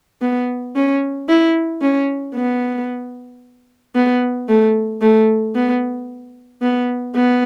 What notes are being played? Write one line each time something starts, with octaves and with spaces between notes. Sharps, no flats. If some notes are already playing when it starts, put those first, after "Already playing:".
B3
C#4
E4
C#4
B3
B3
A3
A3
B3
B3
B3